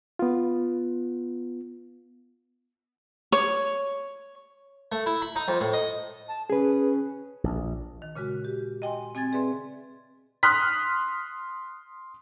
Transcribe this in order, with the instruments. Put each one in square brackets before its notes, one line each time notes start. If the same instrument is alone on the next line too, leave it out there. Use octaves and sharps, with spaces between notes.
[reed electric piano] B3 F4
[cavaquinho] C#5
[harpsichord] A3
E4
B5
D#4
F2
A2
D#5
[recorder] A5
[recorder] C#4 [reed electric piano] G#4 B4
[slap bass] A#1
[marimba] D#3
A#2 C#3 G#3 F#4
G4
D#5 G5 G#5 C6
C4 G#5 C6 G#6 A6
C4 G#4 B4 D5 E5 C6
[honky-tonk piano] C6 D#6 F6 F#6 B6